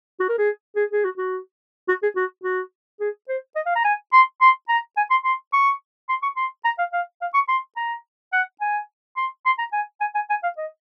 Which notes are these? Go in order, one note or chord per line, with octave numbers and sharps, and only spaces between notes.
F#4
A#4
G#4
G#4
G#4
F#4
F#4
F#4
G#4
F#4
F#4
G#4
C5
D#5
F5
A#5
G#5
C6
C6
A#5
G#5
C6
C6
C#6
C6
C#6
C6
A#5
F5
F5
F5
C#6
C6
A#5
F#5
G#5
C6
C6
A#5
G#5
G#5
G#5
G#5
F5
D#5